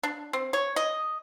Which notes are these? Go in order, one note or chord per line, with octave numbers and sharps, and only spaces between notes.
D4
C4
C#5
D#5